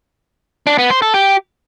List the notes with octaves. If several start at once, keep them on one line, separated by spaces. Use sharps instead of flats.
D4
B3
C5
A4
G4